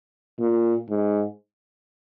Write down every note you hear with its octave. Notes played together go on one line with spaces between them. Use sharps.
A#2
G#2